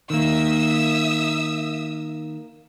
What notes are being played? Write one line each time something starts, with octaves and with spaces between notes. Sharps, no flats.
D#3 A#3 E5 D#6 E6